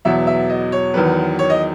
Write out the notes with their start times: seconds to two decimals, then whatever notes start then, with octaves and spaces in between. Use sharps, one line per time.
0.05 E2 B2 F#3 E5
0.27 E5
0.50 D#5
0.72 C#5
0.94 E2 D#3 F#3 B4
1.39 C#5
1.50 D#5